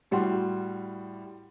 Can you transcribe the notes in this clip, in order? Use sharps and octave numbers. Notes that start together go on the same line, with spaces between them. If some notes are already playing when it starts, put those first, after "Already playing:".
A2 G3 F#4 C6